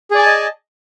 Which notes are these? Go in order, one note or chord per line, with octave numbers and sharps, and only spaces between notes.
G#4 D5 D#5 G#5 A5